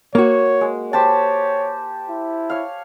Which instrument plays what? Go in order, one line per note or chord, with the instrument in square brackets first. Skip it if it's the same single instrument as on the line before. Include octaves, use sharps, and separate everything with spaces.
[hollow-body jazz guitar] A#3 F#4 [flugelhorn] C#5
[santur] G#3
[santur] G4 C5 A5 [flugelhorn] C#5
[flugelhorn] E4
[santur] C#5 F5